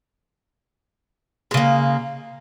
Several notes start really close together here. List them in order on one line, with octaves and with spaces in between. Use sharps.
G#3 C#3 A#3